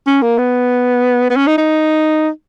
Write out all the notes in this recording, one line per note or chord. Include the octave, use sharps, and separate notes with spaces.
C#4
A#3
B3
B3
C#4
D#4
D#4